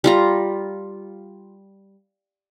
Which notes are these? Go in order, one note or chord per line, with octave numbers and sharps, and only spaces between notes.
G3 F4 A#5